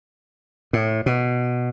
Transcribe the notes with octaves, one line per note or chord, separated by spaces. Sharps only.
A2
B2